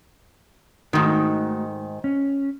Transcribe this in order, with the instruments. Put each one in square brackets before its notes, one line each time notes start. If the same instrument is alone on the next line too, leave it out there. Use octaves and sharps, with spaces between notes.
[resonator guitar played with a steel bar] G#2 D#3 [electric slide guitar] A3 D#4 F#4
[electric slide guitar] C#4